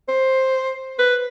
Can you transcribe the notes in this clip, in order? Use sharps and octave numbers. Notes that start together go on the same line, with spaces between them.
C5
B4